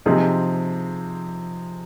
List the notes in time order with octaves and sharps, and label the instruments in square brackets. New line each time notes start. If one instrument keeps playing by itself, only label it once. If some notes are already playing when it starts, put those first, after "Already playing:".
[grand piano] C3 F3 C4 D#4 G#4